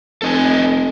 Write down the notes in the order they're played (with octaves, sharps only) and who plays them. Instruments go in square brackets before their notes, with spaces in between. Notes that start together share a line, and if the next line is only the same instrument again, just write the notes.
[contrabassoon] F1 [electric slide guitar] A4 D#5 G#5